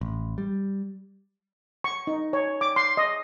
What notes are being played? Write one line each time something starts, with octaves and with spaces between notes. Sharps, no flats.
A1
G3
C#6
D#4
C#5
D6
C6
D#5